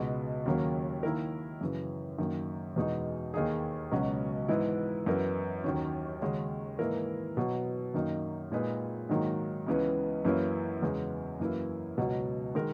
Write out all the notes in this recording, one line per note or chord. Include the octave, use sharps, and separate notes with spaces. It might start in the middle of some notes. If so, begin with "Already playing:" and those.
Already playing: C#2 B2 G#3
D#2 C#3 F#3 A#3
D#3 A#3 E4 A#4
F#2 C#3 E3
F#2 D#3 A#3
E2 B2 G#3 D#4
D#2 D#3 A#3 D#4 G#4
C#2 B2 F#3 C#4 F#4
G#2 E3 B3 E4
F#2 E3 B3 E4 A#4
D#2 D#3 F#3 C#4
D#2 C#3 G#3 C#4 F#4
G#2 E3 A#3 E4 A#4
B2 F#3 B3
F#2 D#3 A#3 D#4
A#2 G#3 D#4 G#4 B4
G#2 D#3 F#3 A#3
C#2 C#3 E3 B3
F#2 E3 A#3 C#4 E4
E2 C#3 G#3 B3
F#2 E3 A#3 E4
C#2 B2 F#3
D#3 G#3 D#4 A#4